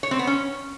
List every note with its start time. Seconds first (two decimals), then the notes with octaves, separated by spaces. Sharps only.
0.03 C#5
0.11 C4
0.19 B3
0.27 C#4